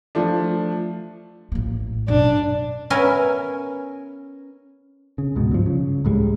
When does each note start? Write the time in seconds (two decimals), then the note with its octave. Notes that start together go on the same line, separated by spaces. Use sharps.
0.15 F3 A3 D4
1.52 A1 A#3
2.08 F#2 B2 D4
2.90 B3 C#4 A#4 E5 G#5
5.18 C#3
5.36 C#2 G#2 B2
5.51 G2 F3
5.66 C#3
6.05 C#2 A2 G3 G#3